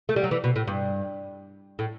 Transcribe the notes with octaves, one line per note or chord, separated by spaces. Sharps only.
A3
G3
F#3
E3
B2
A2
G2
A2